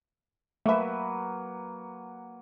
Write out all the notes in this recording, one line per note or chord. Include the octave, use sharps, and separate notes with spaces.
F#3 A3 A#3 B4 E5